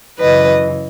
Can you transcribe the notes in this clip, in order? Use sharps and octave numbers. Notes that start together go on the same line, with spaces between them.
F#2 C#3 E3 B4 D#5